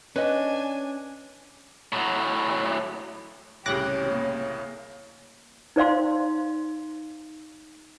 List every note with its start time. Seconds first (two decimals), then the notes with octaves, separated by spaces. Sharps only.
0.16 C#4 D4 B4 D#5 G#5
1.92 A2 F#3
3.66 C2 A2 C#3 G4 C#5 D6 F#6 A#6
4.09 A#3
5.76 D#4 C5 D5 F5 C6